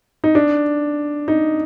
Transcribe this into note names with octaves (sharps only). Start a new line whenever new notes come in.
D#4
D4
D#4